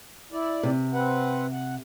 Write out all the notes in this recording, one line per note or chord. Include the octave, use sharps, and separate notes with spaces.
E4 D5
C3
C4 B4 F#5
F#5